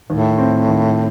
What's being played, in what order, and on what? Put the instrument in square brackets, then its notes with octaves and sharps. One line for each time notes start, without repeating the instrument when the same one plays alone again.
[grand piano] D#2 [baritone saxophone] A2
[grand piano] C4
D#2